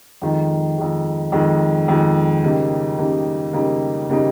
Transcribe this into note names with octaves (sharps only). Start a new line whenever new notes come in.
F2 D#3 G#3
F2 D#3 G#3
F2 D#3 G#3
F2 D#3 G#3
C#3 G3 A#3 D#4
C#3 G3 A#3 D#4
C#3 G3 A#3 D#4
C#3 G3 A#3 D#4